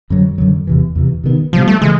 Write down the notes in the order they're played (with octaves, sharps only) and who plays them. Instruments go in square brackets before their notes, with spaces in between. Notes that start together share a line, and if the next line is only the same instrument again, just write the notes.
[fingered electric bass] F#2 D3 F#3
F#2 D3 F#3
E2 C3 E3
E2 C3 E3
C3 D#3 G3 B3
[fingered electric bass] C3 D#3 G3 B3 [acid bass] F3
[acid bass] A3
[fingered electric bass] C#3 E3 [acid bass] G#3